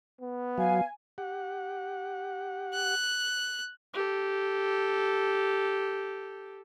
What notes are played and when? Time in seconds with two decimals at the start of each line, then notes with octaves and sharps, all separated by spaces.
0.21 B3
0.58 F#3 F5 G#5
1.18 G4 F#5
2.74 F#6
3.94 G4 A4